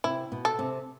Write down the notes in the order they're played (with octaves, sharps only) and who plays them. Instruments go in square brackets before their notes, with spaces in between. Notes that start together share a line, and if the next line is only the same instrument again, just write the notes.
[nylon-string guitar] C3 [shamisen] E4
[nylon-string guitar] B2
[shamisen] A4
[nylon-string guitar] C3